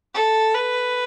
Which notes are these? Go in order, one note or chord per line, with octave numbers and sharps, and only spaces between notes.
A4
B4